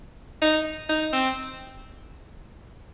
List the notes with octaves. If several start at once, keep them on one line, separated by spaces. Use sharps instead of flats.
D#4
D#4
C4